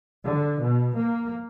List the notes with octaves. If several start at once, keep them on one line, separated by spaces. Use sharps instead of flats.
D3
B2
A#3